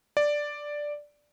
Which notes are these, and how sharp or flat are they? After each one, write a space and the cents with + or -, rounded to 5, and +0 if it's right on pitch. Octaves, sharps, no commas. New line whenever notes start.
D5 +0